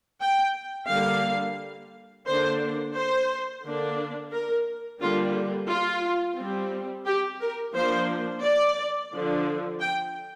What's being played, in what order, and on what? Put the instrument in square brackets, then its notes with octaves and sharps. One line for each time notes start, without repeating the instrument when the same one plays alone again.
[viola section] G5
D3 G3 A#3 F5
D3 A#3 D4 C5
C5
D3 A#3 D4
A#4
D3 G3 A#3 D4 F4
F4
G3 C4
G4
A#4
F3 A#3 D4 C5
D5
D3 F3 D4
G5